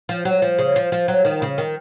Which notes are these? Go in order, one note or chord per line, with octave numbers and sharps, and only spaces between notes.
F3
F#3
F3
C#3
F3
F3
F#3
D#3
C#3
D#3